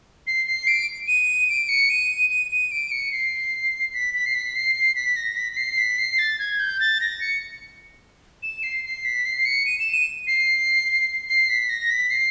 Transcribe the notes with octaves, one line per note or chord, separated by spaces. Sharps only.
C7
C7
D7
D#7
D7
C#7
D#7
D#7
D#7
D7
C#7
C7
B6
B6
C7
B6
C7
C7
B6
A#6
B6
B6
C7
B6
C7
A6
G#6
G6
A6
A#6
C#7
E7
C7
C7
B6
C7
C#7
D#7
E7
D#7
C7
C7
B6
A#6
B6
C7